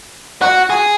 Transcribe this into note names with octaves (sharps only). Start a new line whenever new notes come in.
F#4
G#4